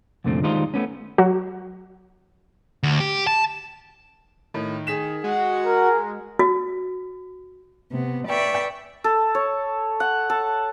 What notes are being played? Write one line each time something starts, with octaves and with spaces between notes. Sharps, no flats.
C2 F2 A#2 D3 A3 C4
D#3 G3 G#3 D#4 F4 C5
A3 B3 C#4
F#3 F#4
D2
G4
A5
A2 D#3
G#4 B6 E7
G#3 F#4 F#5
A#4
F#4
C3 B3
B4 D5 E5 G5 C#6
A4
C#5
F#5
A4